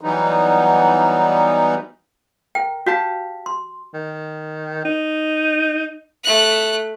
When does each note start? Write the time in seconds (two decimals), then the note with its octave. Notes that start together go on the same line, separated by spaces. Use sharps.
0.01 E3 F#3 G3 B3 D#4
2.55 A#4 G5
2.86 F#4 G4 F5 A5
3.46 C6
3.94 D#3
4.85 D#4
6.24 A3 F#6